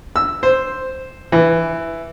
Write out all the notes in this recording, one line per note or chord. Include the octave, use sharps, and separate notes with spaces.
E6
C5
E3